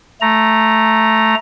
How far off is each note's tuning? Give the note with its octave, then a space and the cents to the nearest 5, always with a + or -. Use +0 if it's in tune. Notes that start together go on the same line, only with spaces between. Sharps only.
A3 +0 A#5 +0